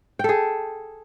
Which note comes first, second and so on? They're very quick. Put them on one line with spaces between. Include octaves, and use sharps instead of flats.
G5 A4 G#4